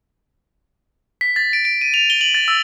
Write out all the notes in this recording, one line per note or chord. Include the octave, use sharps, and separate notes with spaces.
B6
A6
D7
D7
D#7
F7
G7
F#7
A6
E6